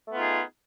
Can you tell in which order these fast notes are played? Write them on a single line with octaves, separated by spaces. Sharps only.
A3 B3 F4 D#4 G#4